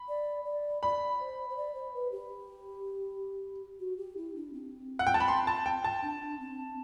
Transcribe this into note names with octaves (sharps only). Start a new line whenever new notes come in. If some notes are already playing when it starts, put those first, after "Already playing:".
Already playing: B5
D5
D5
D5 B5
C5
C5
D5
C5
B4
G4
F#4
G4
E4
D4
C4
F#5
G5
A5
B5
C6
A5
G5
A5
D4
C4